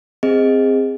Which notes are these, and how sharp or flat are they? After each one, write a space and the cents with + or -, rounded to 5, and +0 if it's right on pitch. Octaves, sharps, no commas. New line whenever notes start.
C4 +0 G#4 -20 D#5 +0